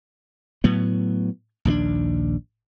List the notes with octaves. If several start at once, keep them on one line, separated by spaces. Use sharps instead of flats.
A2 F#3 B3
A#1 D#2 F3 D4